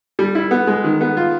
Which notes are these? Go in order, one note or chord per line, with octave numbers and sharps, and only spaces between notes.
G3
E4
B3
G#3
D#3
B3
F4